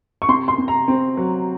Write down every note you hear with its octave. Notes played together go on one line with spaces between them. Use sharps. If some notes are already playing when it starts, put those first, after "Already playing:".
C#6
C3 C6
C6
C3
A#5
C4
F#3